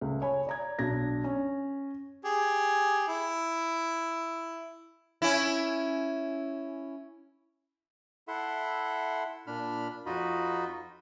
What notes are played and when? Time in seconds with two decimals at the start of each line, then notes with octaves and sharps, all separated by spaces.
0.01 C#2 A3
0.22 C#5 G#5 B5
0.47 D5 A#5 G#6
0.79 B1 D4 G#6 A#6
1.24 C#4
2.25 G4 G#4
3.08 E4
5.22 C#4 E4
8.28 E4 A4 E5 F#5 C6
9.47 A#2 D4 B5 F6
10.06 F2 D#4 F4 F#4 D#5 B5